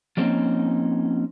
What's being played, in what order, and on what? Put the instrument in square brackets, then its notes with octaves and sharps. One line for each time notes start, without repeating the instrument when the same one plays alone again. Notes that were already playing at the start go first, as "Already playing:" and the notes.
[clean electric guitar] F3 G3 A#3 C4 C#4 D#4